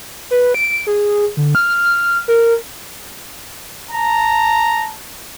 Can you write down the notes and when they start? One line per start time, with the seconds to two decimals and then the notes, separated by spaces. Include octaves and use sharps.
0.31 B4
0.54 D7
0.87 G#4
1.37 D3
1.55 F6
2.28 A#4
3.91 A5 A#5